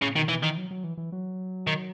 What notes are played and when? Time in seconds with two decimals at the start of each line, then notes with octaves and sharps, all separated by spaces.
0.02 A2 C#3
0.15 B2 D#3
0.29 B2 E3
0.43 D#3 E3
0.57 F#3
0.71 F#3
0.84 E3
0.97 E3
1.12 F#3
1.67 D#3